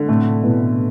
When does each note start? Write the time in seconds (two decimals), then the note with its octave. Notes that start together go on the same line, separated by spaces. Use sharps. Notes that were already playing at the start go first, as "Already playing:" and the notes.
Already playing: D3
0.08 A2 C3 A3
0.43 B2 E3